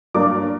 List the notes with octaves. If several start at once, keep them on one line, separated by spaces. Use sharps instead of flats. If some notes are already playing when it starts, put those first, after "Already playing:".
G2 F#3 A#3 D4 D6